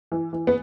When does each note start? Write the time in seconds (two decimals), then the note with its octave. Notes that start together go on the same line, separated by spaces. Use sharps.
0.12 E3
0.33 E3
0.47 B3